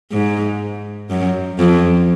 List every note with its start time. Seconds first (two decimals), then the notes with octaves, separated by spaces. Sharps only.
0.12 G#2
1.10 F#2
1.59 F2